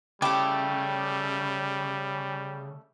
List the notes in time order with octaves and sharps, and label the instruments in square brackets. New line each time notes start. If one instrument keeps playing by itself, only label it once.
[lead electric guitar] C#3 [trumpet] G3 [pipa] A3 E4 G5 [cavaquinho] G4 D6